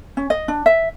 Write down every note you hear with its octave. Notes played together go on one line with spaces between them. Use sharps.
C#4
D#5
D4
E5